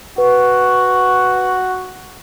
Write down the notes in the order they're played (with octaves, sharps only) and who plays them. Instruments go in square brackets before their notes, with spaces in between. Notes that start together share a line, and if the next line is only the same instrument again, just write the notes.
[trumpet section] F#4 [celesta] B4